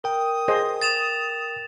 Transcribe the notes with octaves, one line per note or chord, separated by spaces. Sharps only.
A#4 G5 D#6
G#4 C5 D#5
A6 E7 F7